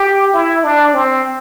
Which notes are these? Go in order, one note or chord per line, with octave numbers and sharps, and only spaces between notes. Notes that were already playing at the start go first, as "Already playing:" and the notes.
Already playing: G4
E4
D4
C4